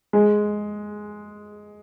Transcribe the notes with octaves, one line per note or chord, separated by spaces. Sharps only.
G#3